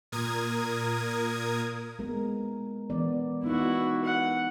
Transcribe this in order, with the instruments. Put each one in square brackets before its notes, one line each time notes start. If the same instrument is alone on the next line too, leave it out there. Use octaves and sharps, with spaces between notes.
[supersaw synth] A#2 A#4 D#6 G#6
[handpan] G#3 B3 A#4
E3 B3 D5
[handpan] B3 D#4 [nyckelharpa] E4 F#4
[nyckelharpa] F#5